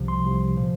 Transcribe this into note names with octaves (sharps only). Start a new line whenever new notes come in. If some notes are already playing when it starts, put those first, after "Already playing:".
Already playing: C2 C3 F3
C6
C2 C3 F3
A#2 F3